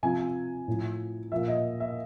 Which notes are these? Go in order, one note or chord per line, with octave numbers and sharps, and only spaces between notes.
C3 F3 G#5
A2 F3
A#2 F3 E5
D#5
E5